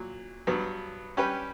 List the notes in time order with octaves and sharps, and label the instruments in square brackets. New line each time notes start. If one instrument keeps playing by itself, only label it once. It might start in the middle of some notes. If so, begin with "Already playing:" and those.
Already playing: [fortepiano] A#2 F#3
G2 F#3 B3
G3 C#4 G4 B4